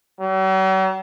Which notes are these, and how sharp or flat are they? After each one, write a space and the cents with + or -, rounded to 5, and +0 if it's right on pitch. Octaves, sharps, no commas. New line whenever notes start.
F#3 +45